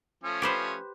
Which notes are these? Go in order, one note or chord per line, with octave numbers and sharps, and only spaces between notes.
F3 A3 C#4
G4 B4 C5